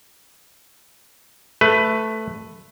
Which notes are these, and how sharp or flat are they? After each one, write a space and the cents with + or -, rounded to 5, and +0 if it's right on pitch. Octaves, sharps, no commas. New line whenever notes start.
A3 +0 B4 +15